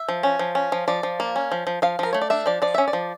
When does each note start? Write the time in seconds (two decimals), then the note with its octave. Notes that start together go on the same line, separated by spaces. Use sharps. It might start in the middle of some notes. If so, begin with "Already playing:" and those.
Already playing: E5
0.09 F3
0.23 C#4
0.39 F3
0.55 C#4
0.72 F3
0.88 F3 D5
1.03 F3
1.20 A#3
1.36 C#4
1.52 F3
1.67 F3
1.82 F3 F5
1.99 F3 A#4
2.13 A3 C#5
2.21 D5
2.30 D4 E5
2.46 F3 D5
2.62 F3 D5
2.74 C#4 E5
2.88 D5
2.93 F3